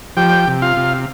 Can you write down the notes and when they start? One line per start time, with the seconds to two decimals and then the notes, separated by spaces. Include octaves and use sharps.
0.17 F3 G4 G5
0.47 C3
0.62 F4 F5
0.77 C3